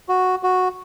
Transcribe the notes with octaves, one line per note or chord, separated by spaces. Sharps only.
F#4
F#4